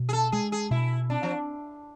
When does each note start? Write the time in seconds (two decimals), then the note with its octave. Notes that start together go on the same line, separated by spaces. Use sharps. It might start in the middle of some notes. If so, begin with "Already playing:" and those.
Already playing: B2
0.09 G#4
0.13 A4
0.32 G#3 G#4
0.52 G#4
0.71 B2 E4
1.10 C4 D4
1.23 F3